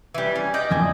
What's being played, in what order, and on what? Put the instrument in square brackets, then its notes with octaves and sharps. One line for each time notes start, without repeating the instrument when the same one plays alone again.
[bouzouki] E3 G3
C#4
D5 D#5 G5
[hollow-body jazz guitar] F2 E3 G#5